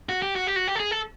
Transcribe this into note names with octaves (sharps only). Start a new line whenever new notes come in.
F#4
G4
F#4
G4
F#4
G4
A4
G#4
A4